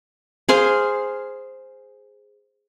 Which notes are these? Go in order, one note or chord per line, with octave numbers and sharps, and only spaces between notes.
G#4 C5 F5